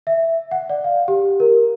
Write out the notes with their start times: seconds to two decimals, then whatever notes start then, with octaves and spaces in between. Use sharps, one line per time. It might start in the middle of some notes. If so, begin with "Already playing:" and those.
0.07 E5
0.51 F#5
0.70 D5
0.84 F5
1.08 G4
1.40 A#4